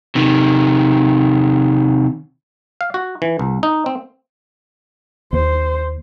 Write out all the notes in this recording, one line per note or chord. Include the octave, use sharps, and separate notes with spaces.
C3 D#3
F5
F#4
E3
C2
D#4
C4
D#2 C5